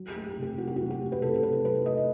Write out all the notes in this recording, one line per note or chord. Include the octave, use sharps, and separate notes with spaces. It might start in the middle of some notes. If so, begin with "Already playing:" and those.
Already playing: F#3
G4
A3
G4
C3
G4
C4 F#4
G4
F#4
F#3
G4
A3
B4
C3 A4
A4
C4 B4
F#3 B4
A3 D#5